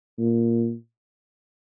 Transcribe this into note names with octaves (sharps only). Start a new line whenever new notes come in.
A#2